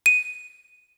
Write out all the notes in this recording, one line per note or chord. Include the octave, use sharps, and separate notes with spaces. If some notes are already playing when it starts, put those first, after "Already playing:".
D#7